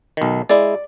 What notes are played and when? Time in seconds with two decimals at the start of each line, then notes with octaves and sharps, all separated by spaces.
0.17 B1 D#3
0.49 G#3 E4 D5